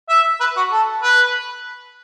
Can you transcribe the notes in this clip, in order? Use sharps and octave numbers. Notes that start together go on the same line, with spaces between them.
E5
B4
F#4
A4
B4